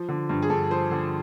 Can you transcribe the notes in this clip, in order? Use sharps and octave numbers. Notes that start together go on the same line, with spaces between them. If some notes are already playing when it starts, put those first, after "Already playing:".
Already playing: F3
D3
G2
G#4
G2 A4
F3 C5
D3